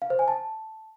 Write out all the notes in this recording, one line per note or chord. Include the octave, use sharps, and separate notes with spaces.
F5
C5
G#5
A5